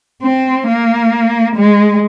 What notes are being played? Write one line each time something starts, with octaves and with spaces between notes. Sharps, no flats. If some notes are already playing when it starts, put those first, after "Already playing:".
C4
A#3
G#3